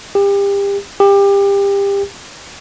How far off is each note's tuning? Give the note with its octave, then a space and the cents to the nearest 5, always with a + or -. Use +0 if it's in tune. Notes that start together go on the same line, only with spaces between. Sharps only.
G4 +30
G4 +25